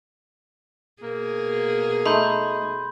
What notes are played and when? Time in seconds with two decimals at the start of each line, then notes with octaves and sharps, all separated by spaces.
1.02 B2 A#3 G#4
2.06 A3 D#4 B5 C6 G6